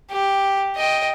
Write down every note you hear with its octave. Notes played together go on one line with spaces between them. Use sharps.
G4
D#5 G5